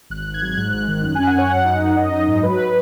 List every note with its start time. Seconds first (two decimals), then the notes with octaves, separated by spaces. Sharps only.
0.10 G#1 F#6
0.27 G#1
0.34 G#6
0.42 F#3
0.57 G#2 F#6
0.73 G#1
0.88 D#3
1.03 F#2 F#6
1.15 C#4 G#5
1.27 F#5
1.35 C#4 C#5
1.50 F#2 F#5
1.65 D#4
1.81 F#2
1.96 D#4 D#5
2.12 D#4
2.28 G#2
2.43 F#3 B4
2.58 F#3